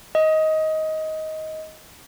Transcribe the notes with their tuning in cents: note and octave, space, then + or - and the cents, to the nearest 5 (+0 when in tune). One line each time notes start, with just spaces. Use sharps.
D#5 +15